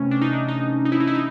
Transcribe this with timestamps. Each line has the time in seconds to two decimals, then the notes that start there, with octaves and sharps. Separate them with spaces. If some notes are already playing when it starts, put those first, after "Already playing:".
Already playing: C3 E3 A3 C#4
0.11 D4
0.22 D#4
0.33 D4
0.48 D#4
0.85 D#4
0.92 E4
1.00 D#4
1.07 E4
1.15 D#4